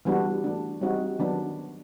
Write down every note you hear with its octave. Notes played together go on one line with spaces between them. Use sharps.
E3 G3 B3 D4 F#4
E3 A3 D4
G3 C4 D#4 F#4
D#3 F#3 B3 D4